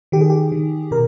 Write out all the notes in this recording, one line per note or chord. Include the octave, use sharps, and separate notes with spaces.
D#3 G4
G#4
G4
D#3
B2 A#4